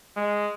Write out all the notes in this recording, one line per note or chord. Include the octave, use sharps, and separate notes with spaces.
G#3